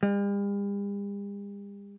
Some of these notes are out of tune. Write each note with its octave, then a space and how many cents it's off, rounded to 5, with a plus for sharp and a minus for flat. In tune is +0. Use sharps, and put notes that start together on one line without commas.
G3 +45